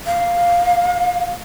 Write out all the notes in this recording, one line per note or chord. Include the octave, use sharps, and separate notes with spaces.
F5